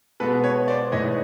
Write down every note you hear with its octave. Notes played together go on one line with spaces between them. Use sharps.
B2 G#3 B3 A4 B4
B4 C#5
C5 D5
G#2 E3 A3 C#5 D#5